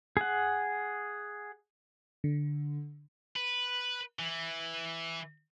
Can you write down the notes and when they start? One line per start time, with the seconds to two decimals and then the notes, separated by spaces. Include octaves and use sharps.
0.17 G#4 F#5
2.24 D3
3.36 B4
4.19 E3